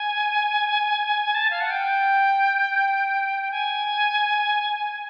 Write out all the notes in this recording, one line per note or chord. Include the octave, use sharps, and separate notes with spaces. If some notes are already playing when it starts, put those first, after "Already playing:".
Already playing: G#5
A5
F5
F#5
G5
G#5